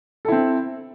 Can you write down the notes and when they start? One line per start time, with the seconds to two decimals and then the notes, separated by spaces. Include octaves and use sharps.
0.25 A4
0.28 E4
0.32 C4